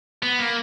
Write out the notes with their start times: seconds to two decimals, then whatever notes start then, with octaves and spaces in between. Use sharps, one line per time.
0.23 B3
0.39 A#3